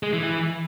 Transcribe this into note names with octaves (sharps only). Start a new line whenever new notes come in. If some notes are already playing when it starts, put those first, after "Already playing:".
G#3
E3
E3